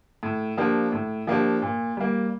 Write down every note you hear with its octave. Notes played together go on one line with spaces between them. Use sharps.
A2
F3 A#3 D4 G4
A2
F3 A#3 D4 G4
A#2
G3 A#3